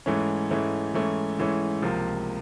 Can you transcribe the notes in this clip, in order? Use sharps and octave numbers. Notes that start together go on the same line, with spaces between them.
G#2 E3 A3 C#4
G#2 E3 A3 C#4
G#2 E3 A3 C#4
G#2 E3 A3 C#4
C#2 C3 F3 A#3